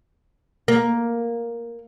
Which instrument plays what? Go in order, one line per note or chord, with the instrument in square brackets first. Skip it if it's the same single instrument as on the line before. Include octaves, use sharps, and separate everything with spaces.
[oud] A#3